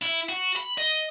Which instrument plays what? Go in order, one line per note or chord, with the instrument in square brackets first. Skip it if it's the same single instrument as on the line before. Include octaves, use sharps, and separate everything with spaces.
[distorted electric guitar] E4
F#4
B5
D#5